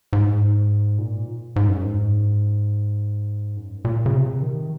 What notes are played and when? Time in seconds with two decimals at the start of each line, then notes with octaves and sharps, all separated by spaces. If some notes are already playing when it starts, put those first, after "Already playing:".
0.13 G#2
0.98 A#2
1.56 G#2
1.69 F#2
1.82 G#2
3.57 F#2
3.78 G#2
3.85 A#2
4.06 C#3
4.14 C3
4.42 D#3